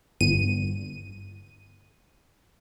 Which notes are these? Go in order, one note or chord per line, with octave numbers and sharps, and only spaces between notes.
G1 D#7